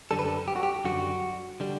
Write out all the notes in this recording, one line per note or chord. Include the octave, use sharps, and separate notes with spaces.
F#2 D3 G3 A4
B4
A4
G4
F#4
G4
F#2 D3 G3 F#4
D3 G3